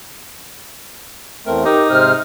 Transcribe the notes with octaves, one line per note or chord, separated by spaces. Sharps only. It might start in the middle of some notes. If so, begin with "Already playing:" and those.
E2 A3 C4 A#4
D#4 G4 A#4
G#2 C3 C5 F6